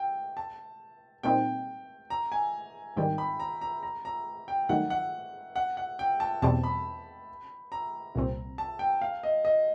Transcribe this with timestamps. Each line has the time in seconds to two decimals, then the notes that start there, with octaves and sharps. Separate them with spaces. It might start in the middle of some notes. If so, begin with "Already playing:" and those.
Already playing: G5
0.37 A5
1.23 A#2 G3 C4 D#4 G5
2.10 A#5
2.32 G#5
2.96 G#1 G2 D#3 G3 G5
3.18 B5
3.40 A#5
3.61 A#5
3.83 A#5
4.05 A#5
4.48 G5
4.69 G2 D#3 F#3 A3 F#5
4.90 F#5
5.56 F#5
5.77 F#5
5.99 G5
6.20 A5
6.42 E2 B2 G3 C4 A5
6.64 B5
7.72 A#5
8.15 C2 A#2 G3 C4
8.58 A5
8.79 G5
9.02 F5
9.23 D#5
9.45 D#5